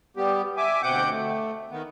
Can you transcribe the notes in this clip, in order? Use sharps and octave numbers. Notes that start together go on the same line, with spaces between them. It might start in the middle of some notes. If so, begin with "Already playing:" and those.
G3 B3 G4
E5 G#5 D6
D2 B2 C4 F#5 D6 G6
A3
D#3 B3